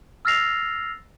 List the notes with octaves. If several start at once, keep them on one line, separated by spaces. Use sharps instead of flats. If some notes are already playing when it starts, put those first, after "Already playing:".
E6 F6 A6 A#6 C7 F7